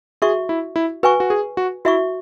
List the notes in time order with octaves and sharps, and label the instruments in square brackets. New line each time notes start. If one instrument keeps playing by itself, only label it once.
[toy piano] F#4 E5 C#6 [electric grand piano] G#4
[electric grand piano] E4
E4
[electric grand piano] F#4 [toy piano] B4 G#5 C#6
[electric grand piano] F#4
G#4
F#4
[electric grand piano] E4 [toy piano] F#4 E5 C#6